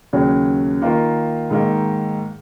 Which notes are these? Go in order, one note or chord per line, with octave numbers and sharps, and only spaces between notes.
D#2 C#3 F#3
D#3 A#3 F4 A#4
G#2 D#3 A#3